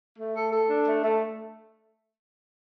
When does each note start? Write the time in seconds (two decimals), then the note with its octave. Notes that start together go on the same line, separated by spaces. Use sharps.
0.17 A3
0.35 A4
0.52 A4
0.69 D4
0.86 A3
1.04 A3